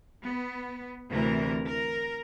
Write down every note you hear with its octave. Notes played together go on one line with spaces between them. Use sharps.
B3
D2 C3 E3 A#4
A#4